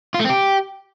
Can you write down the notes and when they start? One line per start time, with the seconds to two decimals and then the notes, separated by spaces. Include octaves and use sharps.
0.14 F4
0.20 A3
0.25 C4
0.30 G4